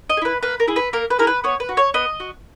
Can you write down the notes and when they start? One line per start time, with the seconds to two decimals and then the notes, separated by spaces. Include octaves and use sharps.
0.10 D#5
0.17 G#4
0.21 E4 B4
0.43 A#3 B4
0.60 A#4
0.68 E4 G#4
0.76 B4
0.93 A#3 A#4
1.10 B4
1.19 E4 G#4 A#4
1.27 B4
1.44 B3 C#5
1.60 B4
1.69 F#4
1.77 C#5
1.94 B3 D#5
2.20 F#4